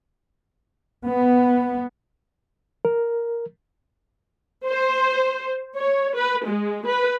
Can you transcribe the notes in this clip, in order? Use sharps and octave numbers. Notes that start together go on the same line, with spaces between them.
B3
A#4
C5
C#5
B4
G#3
B4